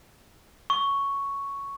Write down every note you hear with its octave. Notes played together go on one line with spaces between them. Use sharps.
C#6